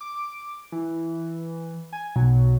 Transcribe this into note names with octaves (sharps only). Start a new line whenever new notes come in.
D6
E3
G#5
B1 F#3